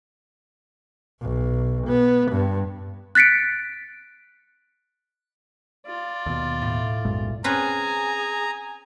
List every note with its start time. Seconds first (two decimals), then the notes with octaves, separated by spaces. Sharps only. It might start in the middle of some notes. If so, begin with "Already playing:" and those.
1.21 B1
1.87 B3
2.31 G2
3.15 F#6 A6 B6 C#7 D7
5.86 F4 D5
6.26 D#2 B2
6.62 A2
7.05 B1 F#2 G#3
7.44 C4 C#4 G#4 B4 G#5 A#5